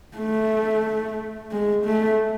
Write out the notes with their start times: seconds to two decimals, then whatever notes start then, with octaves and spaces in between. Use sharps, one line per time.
0.17 A3
1.52 G#3
1.85 A3